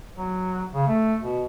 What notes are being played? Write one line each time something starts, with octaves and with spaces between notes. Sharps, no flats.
F#3
C#3
A3
B2